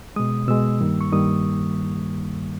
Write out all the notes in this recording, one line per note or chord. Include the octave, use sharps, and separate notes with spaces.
B2 G#3 D#6
B2 G#3 E6
G2 D#3 G3 A#3
C#6
G2 D#3 G3 A#3 D#6